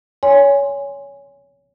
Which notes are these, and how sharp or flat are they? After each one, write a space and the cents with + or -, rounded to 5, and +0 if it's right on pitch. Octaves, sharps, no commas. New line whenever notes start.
C#5 +20 G#5 -15 C6 +0